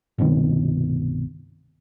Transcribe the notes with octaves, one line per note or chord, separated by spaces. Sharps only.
G1 C2 B2 D#3